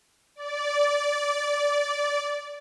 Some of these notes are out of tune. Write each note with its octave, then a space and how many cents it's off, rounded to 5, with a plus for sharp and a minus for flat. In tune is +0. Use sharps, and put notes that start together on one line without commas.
D5 -15